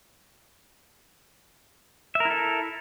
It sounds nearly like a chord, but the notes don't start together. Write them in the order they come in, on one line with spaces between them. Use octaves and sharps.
E5 A#4 E4 A4